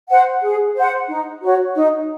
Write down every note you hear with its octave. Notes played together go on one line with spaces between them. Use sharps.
C5 F#5
G#4
C5 F#5
D#4
F#4 C#5
D#4